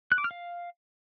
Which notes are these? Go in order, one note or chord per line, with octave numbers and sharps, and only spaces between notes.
F#6
D6
F6
F5